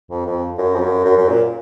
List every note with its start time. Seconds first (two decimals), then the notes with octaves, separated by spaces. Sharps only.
0.11 F2
0.27 F2
0.58 F#2
0.74 F2
0.81 F#2
1.05 F#2
1.17 F#2
1.29 A#2